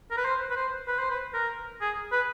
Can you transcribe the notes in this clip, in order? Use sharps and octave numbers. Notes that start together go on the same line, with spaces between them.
A#4
B4
C5
B4
C5
B4
C5
B4
A#4
G#4
B4